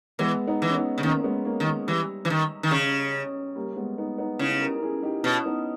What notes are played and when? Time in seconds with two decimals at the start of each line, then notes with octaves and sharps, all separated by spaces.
0.19 E3 G#3 B3
0.47 B3 D#4
0.62 E3
0.70 C#4
0.75 B3 D#4
0.98 C#3
1.03 D#3 A#3 C#4
1.20 C#4
1.24 G#3 B3
1.45 A#3 C#4
1.60 D#3
1.66 G#3
1.87 E3 G3
2.25 E3
2.30 D#3
2.63 D#3
2.71 C#3
3.55 G3 A#3
3.76 G#3 B3
3.98 B3 D#4
4.18 B3 D#4
4.39 C#3 E4 G#4
4.61 G4 A#4
4.74 A#4
4.82 E4 G#4
5.03 D#4 G4
5.23 B2 C#4 E4
5.46 B3 D#4